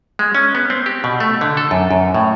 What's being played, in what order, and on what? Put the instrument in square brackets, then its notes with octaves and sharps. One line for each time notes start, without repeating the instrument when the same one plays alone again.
[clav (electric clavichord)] G#3
C#4
B3
C4
G4
B2
A3
D3
A4
F#2
F#2
A2